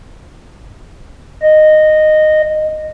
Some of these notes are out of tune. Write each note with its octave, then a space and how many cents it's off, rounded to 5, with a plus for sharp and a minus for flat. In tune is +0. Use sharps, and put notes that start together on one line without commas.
D#5 -10